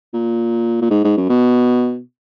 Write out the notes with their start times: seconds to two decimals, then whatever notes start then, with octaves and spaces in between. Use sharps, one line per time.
0.14 A#2
0.82 A#2
0.90 G#2
1.04 G#2
1.17 F#2
1.29 B2